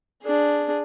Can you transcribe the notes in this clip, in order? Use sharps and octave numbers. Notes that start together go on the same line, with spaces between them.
D4 G#4